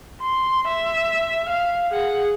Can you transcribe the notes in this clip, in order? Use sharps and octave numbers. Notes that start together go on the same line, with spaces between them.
C6
E5
F5
G#4 F#5